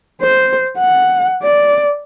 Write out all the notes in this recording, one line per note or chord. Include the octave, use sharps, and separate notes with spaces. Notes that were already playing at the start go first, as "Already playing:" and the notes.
C5
F#5
D5